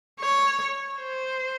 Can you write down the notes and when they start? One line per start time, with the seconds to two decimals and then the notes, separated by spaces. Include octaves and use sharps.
0.20 C#5
1.00 C5